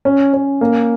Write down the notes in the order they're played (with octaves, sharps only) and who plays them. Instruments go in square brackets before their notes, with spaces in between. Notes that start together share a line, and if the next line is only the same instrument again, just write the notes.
[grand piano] C#4
C#4
A#3